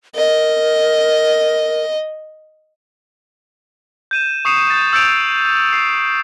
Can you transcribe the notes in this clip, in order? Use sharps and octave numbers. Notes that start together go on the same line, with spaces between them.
A#4 D#5
G6 D#7 E7
C#6 D#6 C7 C#7 E7
G6 A6
E6 G6 A6 C#7 D7 F7
C7